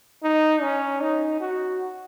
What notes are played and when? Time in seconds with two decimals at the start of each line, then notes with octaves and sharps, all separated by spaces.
0.24 D#4
0.62 C#4
1.01 D#4
1.41 F#4